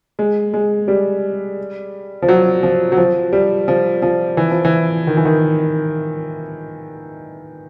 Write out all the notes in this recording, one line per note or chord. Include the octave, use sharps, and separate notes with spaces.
G#3
G#3
G3
F3
F#3
F3
F#3
F3
G3
F3
F3
E3
F3
E3
D#3
E3
D#3